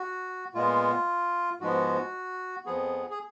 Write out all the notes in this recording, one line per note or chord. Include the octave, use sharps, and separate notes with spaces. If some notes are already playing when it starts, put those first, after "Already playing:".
Already playing: F#4
A#2 G#3 B3 F4
G#2 F3 G#3 B3 F#4
F2 F3 B3 G#4
G#4